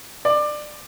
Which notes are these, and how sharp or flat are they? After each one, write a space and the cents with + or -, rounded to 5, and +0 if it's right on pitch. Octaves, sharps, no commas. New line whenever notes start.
D5 +20